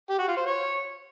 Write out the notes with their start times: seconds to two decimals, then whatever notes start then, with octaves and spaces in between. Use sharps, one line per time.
0.10 G4
0.19 F#4
0.28 F4
0.37 C5
0.46 C#5